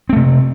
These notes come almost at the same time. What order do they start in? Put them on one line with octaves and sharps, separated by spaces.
C4 A3 C3